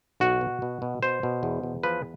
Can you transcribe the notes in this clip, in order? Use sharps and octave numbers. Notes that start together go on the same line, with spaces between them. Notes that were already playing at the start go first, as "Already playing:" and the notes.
B1 F#4
B2
B2
B2
B2 C5
B2
E2
E2
F3 B4